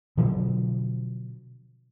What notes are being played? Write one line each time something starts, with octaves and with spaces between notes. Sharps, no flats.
B2 D3 F3 F#3